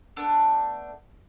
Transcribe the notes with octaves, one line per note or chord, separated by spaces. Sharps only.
A3 B3 D4 D5